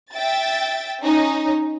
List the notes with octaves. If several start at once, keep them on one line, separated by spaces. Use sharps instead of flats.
E5 G5 A6
C#4 D#4